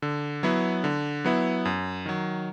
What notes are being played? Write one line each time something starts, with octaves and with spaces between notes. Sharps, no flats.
D3
F#3 B3 E4
D3
F#3 B3 E4
F#2
D#3 F#3